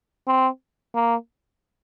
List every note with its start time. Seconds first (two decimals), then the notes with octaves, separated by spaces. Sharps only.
0.27 C4
0.95 A#3